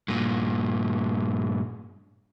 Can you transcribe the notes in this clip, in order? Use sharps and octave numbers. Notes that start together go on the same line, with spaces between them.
G2 A#2